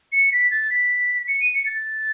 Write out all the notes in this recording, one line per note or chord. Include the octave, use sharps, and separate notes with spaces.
C#7
B6
A6
B6
C#7
D#7
C#7
A6